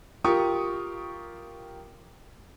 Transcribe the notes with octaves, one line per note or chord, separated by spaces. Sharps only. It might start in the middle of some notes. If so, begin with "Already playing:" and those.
F4 G4 A#4 C#6 D#6